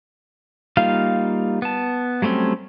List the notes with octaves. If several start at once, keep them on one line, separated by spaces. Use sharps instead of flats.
G3 A#3 D#4 F4 F5
B3 A5
F#3 G3 A3 C4 C#4